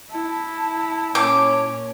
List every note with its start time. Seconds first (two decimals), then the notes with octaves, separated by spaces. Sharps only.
0.11 E4 A5
1.15 A#2 C#4 D6